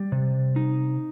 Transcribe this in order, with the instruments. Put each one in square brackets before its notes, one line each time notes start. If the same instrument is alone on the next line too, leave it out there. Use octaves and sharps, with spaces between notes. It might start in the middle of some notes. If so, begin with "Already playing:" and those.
Already playing: [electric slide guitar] G3
C3
D#4